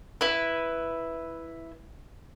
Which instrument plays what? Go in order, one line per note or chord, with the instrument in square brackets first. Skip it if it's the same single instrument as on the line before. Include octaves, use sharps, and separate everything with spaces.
[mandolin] E4 B4